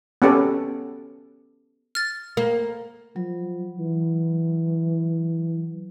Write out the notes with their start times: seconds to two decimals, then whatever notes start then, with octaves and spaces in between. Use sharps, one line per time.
0.22 B3 C#4 G4 A4
1.95 F6 A6
2.37 A#3
3.16 F3 F#3
3.78 E3